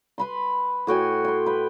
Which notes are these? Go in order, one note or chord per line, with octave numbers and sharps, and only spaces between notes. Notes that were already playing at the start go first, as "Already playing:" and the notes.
B4 B5 C6
A2 F#4 G5 G#5
G5 C6
B4 G5